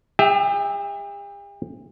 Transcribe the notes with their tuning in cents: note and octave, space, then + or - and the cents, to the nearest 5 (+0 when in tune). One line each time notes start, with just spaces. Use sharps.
G4 +45 E5 -20 G5 +0